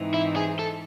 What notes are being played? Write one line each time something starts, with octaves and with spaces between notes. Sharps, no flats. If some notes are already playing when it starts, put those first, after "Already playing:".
Already playing: G#2 E3 C4 D#4
E4
G#4
A4